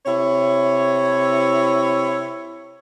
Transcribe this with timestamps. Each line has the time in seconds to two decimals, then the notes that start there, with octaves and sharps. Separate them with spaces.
0.06 C3 E4 C#5